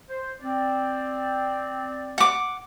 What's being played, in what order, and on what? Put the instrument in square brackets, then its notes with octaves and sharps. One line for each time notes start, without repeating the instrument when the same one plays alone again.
[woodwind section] C5
C4 D5
[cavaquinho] F#5 D6